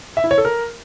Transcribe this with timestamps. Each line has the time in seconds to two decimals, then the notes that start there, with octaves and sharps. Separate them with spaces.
0.17 E5
0.24 E4
0.31 C#5
0.38 A4
0.45 A#4